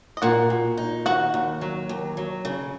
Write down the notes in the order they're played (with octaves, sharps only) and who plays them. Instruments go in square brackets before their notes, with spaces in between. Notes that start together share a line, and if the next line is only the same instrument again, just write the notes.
[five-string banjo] D#5
[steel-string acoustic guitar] A#2 [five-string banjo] F#4 F#5
[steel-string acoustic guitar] A#2
D#4
[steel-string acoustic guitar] D#2 [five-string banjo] F#4 F#5
[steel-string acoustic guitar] D#2
F#3
D#2
F#3
C#3